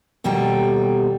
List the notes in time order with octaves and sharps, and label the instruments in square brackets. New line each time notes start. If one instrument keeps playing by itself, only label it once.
[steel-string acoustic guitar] D#2 B2 G3 A4 G5 A#5